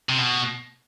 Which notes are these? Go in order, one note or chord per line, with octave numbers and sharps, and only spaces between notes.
C3
B2